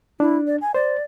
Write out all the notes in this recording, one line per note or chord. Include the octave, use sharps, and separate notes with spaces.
D4 E4
D5
G#5
C5 D5